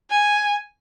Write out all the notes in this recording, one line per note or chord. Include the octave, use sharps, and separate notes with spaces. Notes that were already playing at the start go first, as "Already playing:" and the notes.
G#5